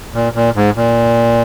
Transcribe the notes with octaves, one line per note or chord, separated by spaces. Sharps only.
A#2
A#2
G#2
A#2